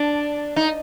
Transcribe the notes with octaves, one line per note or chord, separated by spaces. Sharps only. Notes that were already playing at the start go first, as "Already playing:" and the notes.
Already playing: D4
D#4